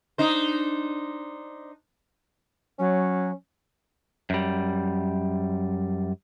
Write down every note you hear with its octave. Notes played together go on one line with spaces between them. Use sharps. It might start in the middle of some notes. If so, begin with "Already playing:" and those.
D4 D#4 C5
F#3 C#4
F#2 G3